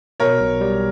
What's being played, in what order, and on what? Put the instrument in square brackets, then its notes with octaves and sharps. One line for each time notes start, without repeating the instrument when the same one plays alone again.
[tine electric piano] B2 [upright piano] A#4 C#5
[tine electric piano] B1
G3